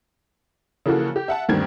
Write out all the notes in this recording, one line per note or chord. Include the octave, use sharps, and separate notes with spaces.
C#3 E3 F3 A#3 F#4 A4
G4
E5 F#5 A5
D2 G2 D#3 C4 D4 G#6